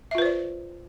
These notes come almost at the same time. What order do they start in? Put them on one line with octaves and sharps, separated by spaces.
E5 F4 B4 C5 D5